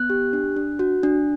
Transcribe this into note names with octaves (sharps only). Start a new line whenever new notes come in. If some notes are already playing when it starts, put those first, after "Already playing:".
Already playing: B3 F#6
G4
D4
D4
F#4
D4